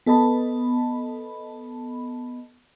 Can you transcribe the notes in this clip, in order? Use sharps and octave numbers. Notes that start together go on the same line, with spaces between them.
B3 A4 D#5 A5 B5